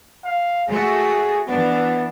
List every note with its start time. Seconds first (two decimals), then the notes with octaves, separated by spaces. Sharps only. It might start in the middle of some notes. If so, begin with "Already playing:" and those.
0.24 F5
0.69 A3 F#4 G#4
1.48 E3 B3 D4